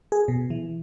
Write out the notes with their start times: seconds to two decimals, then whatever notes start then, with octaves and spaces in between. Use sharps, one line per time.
0.12 G#4
0.28 B2
0.50 E3